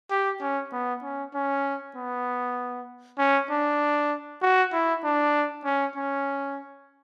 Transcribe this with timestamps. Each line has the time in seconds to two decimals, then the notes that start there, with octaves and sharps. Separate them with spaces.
0.11 G4
0.41 C#4
0.72 B3
1.03 C#4
1.34 C#4
1.96 B3
3.19 C#4
3.50 D4
4.42 F#4
4.73 E4
5.04 D4
5.65 C#4
5.96 C#4